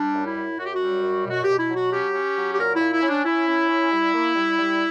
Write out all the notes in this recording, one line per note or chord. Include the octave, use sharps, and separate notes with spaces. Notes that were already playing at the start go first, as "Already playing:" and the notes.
Already playing: G3 D4
F#2
E4
F#2
F#2 F#4
G4
F#4
G3
F#2
B2 F#4
B2 G4
E4
F#3 F#4
C#4 G4
C#4
F#3
G4
A#2 A#4
E4
A#2
E4
C#4
D4
C#4 E4
C#4
C#4
G3
A#3
G3
G3